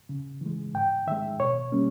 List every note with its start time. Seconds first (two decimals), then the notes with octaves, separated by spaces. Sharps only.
0.09 C#3
0.41 E3 G#3
0.74 G#2 G5
1.07 D#3 G#3 E5
1.40 B2 C#5
1.72 G3 A#3 C#4